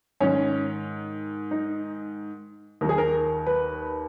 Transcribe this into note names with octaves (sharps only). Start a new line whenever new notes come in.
G#2 D#3 C#4
D#4
D#2 D#3 G#4 A#4
A#4
B4